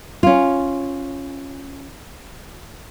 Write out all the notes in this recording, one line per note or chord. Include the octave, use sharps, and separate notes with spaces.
C#4 F4